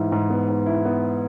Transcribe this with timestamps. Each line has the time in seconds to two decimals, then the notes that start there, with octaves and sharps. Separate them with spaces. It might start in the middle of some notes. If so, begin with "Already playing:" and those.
Already playing: G#2 E3 E4
0.12 G#2
0.30 B3
0.49 G#2
0.66 E4
0.85 B3